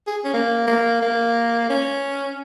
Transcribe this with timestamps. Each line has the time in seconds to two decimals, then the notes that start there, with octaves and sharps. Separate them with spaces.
0.07 G#4
0.25 C#4
0.33 A#3
0.67 A#3
1.02 A#3
1.70 C#4